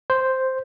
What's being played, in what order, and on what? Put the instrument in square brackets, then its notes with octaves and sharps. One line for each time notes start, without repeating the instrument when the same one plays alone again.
[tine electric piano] C5